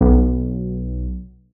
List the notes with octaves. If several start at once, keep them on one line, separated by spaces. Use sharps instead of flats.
B1